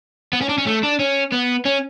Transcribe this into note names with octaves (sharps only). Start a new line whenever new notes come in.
B3
C#4
D4
C#4
A3
D4
C#4
B3
C#4